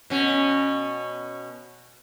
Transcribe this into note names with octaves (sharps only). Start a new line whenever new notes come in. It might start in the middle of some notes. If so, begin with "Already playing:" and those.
B2 C#4